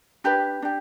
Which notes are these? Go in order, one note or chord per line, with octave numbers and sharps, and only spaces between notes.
D4 G4 B4
D4 G4